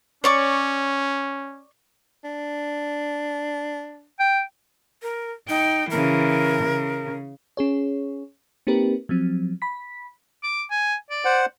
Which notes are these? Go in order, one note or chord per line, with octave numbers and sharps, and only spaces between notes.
C#4 C#5 D5 C#6
D4
G5
A#4
D#4 G5
C#3 E3 A#4
C#3
C#4 G#4 C#5
A#3 C4 D#4 G4 A#4 B4
F3 F#3 C4
B5 B6
D6
G#5
D5
C5 F#5